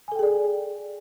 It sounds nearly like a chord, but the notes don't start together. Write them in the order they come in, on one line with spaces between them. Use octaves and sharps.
G#5 A4 G5 G#4 D5